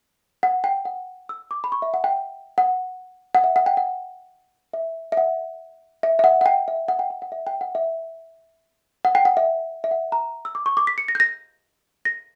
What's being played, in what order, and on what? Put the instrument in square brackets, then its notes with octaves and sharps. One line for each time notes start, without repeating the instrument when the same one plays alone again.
[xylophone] F#5
G5
F#5
E6
D6
B5
C#6
E5
F#5
G5
F#5
F#5
E5
F#5
G5
F#5
E5
E5
F#5
E5
E5
F#5
F#5
G5
E5
F#5
G5
G5
F#5
E5
G5
F#5
E5
F#5
G5
F#5
E5
E5
F#5
A#5
E6
D6
C#6
D6
B6
C#7
A#6
G6
A#6
A#6